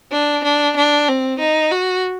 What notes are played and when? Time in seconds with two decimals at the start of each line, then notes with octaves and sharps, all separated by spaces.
0.12 D4
0.44 D4
0.77 D4
1.08 C4
1.40 D#4
1.71 F#4